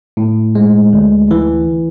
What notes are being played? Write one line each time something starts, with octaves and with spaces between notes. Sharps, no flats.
A2
G#3
D2
E3